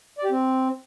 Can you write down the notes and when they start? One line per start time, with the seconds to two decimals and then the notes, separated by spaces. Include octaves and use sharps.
0.18 D5
0.24 G4
0.30 C4